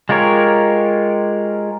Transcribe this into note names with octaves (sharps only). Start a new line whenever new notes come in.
G#3 F4 G4 A#4 C#5